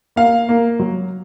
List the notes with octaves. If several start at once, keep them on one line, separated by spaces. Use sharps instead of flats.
A#3 F5
A#3
F#3